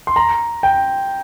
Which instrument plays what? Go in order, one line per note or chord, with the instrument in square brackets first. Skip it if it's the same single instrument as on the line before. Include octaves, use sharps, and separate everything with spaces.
[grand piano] C6
A#5
G5